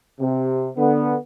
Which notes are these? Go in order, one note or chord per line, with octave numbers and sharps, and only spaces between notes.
C3
D3 B3